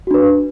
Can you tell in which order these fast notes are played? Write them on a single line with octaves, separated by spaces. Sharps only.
F#4 D4 B4